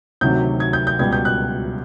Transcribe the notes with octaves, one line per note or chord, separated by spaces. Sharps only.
D2 C3 D#3 F#3 G6
G#6
G6
G6
C#2 B2 G3 G#6
G6
F#6